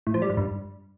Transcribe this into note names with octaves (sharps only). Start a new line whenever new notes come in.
A2
F3
G3
G#2
G2